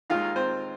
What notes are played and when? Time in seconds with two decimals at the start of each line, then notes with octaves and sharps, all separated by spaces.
0.10 D#2 D#3 G#3 D#4 F4 F5
0.36 C4 C5